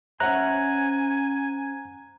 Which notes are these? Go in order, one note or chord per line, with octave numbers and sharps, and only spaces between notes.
C#4 C5 C#5 E5 F#5 G#5 A#5 F#6